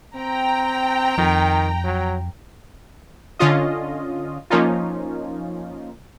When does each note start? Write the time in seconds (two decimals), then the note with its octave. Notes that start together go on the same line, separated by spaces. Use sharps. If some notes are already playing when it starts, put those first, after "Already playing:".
0.15 C4 G5 A#5
1.18 F2 D#3
1.84 F#3
3.39 D3 C#4 F4 D#5
4.50 F3 A#3 C#4 D#4 F4